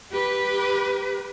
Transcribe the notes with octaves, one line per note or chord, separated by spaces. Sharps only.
G4 B4